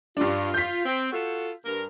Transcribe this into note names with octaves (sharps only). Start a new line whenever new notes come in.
G2 D4 F4
F4 G6 B6
C4
F4 F#4 A4
G2 A#4